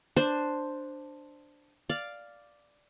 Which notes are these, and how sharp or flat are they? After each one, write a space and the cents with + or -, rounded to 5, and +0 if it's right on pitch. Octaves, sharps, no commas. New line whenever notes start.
D4 +5 C5 +0
D5 +0 F5 +0